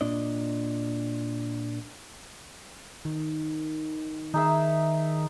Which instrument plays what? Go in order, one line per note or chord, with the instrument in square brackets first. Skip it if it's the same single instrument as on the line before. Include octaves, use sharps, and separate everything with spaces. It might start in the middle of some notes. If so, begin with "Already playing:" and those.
[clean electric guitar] A#2 D4 D5 D#5
[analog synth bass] D#3
[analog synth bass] D#3 [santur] D#4 G#4 E5